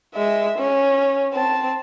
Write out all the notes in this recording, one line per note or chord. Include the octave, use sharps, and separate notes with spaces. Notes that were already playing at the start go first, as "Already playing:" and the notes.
G#3 E5
C#4
C4 A5